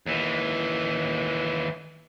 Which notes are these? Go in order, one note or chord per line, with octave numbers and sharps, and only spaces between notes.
D#2 E3